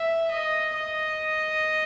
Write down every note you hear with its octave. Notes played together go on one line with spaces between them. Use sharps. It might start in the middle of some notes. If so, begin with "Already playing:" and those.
Already playing: E5
D#5
D#5